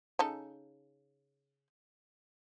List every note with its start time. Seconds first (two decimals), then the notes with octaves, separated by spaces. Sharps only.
0.19 C#3 D#4 A4